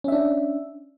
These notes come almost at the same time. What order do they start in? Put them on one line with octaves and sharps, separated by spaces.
C#4 E5 D4